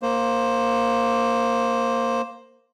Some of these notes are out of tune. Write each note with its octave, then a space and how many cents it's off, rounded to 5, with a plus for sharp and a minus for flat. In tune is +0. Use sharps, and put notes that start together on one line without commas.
A#3 +0 C5 +10